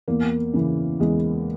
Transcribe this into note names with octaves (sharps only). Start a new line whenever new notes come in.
E2 A#3
C#3 E3
E2 G#3